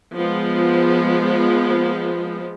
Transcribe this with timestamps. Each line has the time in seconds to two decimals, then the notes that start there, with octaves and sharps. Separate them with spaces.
0.15 F3 G#3 B3